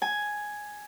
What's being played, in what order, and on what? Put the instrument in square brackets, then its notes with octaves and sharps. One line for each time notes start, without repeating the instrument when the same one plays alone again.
[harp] G#5